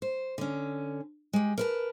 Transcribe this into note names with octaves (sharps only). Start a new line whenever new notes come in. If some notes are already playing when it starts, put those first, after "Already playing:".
C5
D3 C#4
G#3 G4
A#4 B4 A5